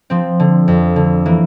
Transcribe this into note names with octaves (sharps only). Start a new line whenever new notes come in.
F3 C4
D3
F2
D3
E3 A#3